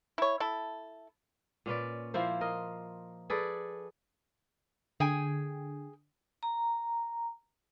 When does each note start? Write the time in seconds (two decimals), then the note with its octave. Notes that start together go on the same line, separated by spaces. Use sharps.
0.18 E4 C#5
0.40 E4 A4
1.66 A#2 C#4 B4 D5
2.14 F3 A#3 E4 C5
2.41 A#4 D#5
3.30 G#4 A4 B4 D5
5.00 D3 G#4 G5 G#5
6.43 A#5